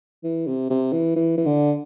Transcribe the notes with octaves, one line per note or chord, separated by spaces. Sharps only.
E3
C3
C3
E3
E3
E3
D3